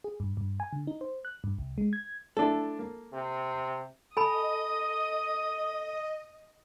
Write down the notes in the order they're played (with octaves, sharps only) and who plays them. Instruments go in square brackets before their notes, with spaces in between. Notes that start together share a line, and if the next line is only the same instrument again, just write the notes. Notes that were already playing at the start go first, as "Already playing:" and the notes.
[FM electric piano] G#4
G2
G2
G#5
D3
D#4
C5
F#6
G2
C2
G#3
G#6
[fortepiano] A3 D4 E4 [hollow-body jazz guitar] A4
[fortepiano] A#3
[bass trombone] C3
[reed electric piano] A4 [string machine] D#5 [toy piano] G#5 B5 [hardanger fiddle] D#6